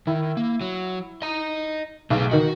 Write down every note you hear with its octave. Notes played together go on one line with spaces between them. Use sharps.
D#3 E4
A#3
F#3
D#5 A#5
B1 A3 G#4 F5
D#3 D#4 F#4